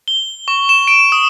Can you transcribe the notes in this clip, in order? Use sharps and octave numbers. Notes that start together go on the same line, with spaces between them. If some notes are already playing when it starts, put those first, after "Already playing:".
G7
C#6
E7
D7
D#6